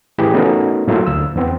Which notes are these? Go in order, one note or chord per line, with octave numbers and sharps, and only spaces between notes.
A2 E3 G4 G#4 B5
A3 B3 C#4 D#4 F#4 A#4
A2 F#3 A3 A#3 E4 F4
D2 E6
E2 B3 C4